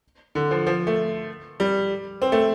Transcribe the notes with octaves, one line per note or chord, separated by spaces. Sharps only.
D3
F3
F3
A3
G3
C4
A3